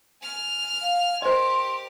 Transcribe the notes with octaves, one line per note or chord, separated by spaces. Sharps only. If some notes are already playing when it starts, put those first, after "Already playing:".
G#5 F6
F5
G4 A#4 C5 D#5 C6